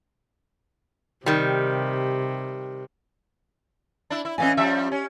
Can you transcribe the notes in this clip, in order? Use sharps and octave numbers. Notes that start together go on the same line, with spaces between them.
C3 D#3 G3
D4 E4
E4
A2 E3 C#4 D#5 F5 G#5
F3 G3 E5
C#4